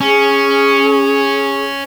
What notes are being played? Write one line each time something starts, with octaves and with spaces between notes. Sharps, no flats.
C#4 G#4